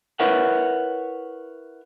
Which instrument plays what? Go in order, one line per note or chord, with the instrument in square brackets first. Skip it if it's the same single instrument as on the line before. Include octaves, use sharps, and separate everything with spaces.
[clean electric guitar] E4 A#4 B4 C#5 E5 F#5